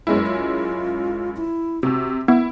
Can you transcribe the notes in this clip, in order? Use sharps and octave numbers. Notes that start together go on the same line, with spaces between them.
F#2 G#3 B3 E4
F4
E4
C3 F#4 E6
B3 E4 E5